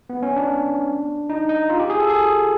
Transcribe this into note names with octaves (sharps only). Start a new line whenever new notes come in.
B3
C#4
D4
D#4
D#4
F4
G4
G#4
A4
G#4